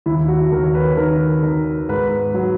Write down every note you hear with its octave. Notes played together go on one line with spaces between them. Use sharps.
D#2 E4
F#4
D#2 A#4
C#5
B4
D#3 A#4
D#3 A#4
G#2 B4
F#3